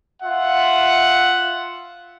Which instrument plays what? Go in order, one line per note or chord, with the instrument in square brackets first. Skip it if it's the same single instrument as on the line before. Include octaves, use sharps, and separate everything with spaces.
[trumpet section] F4 E5 F#5